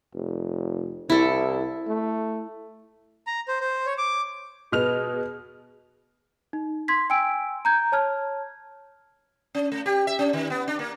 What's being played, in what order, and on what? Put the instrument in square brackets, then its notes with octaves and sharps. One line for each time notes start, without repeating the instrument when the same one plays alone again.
[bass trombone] F1
[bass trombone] C2 [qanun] E4 A4
[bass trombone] A3
[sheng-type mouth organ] A#5
C5
C5
C#5
D6
[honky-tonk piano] B2 F6 F7 [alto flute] G#4 [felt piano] B4 D#5
[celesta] D#4
C6 G#6 B6
G5 G#5 E6 D7
A#5 G6 G#6
C#5 A5 F6 G#6
[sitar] C#4
A3
G4
E5
C#4
D#3
B3
D4
A#3